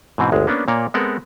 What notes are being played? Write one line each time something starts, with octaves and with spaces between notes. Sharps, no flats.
G#2 B2 E3 C4
G1 D2 G#3
A#3 B3 C#4 D4
A#2 A#3 C#5 D5
G#3 B3 C4 A4 A#4 F#5